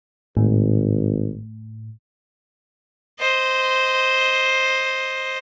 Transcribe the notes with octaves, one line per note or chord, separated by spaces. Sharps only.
G#1 A2
C5 D#5